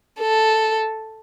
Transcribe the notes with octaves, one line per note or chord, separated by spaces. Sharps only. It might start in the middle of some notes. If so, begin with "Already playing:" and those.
A4